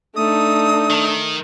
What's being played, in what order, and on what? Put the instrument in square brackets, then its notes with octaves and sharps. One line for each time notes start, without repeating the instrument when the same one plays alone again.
[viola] A3 D#4 [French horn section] D4 [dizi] D#6
[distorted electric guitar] D#3